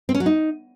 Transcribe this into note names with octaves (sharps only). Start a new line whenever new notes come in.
C4
C#4
F#3
D#4